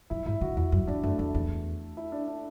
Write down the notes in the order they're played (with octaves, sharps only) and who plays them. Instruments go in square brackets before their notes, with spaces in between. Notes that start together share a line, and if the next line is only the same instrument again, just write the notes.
[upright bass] F#2 [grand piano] E4
[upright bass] G#2 [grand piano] E4
[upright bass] D3 [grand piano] F#4
[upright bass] E2 [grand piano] E4
[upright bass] F#2 [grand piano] F#4
[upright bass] E2 [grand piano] D4
[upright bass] F#2 [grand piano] A3
[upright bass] E2 [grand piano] A3
[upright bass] E2
[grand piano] E4
D4
D4